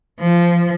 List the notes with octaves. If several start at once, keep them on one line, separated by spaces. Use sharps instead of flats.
F3